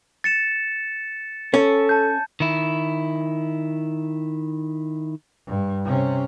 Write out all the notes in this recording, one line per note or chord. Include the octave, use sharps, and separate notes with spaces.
A6 C#7 E7
C#4 A4
A5 G6
D#3 E4
G2
C3 C#4